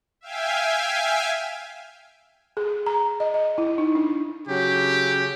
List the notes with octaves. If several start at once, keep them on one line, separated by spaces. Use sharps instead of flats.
E5 F5 G5 G#5
G#4
A#5
D#5
D#5
E4
D#4
D4
C#3 F#3 G4